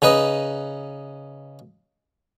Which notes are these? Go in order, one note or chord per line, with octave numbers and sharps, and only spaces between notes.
C#3 D#4 B4 D#5